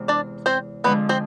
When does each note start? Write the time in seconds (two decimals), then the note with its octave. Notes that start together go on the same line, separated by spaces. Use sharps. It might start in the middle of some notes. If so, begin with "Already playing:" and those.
Already playing: E2 C3 G#3
0.08 D4 D5
0.46 C4 C5
0.84 F2 D3 F3 G#3 B3 B4
1.09 C4 C5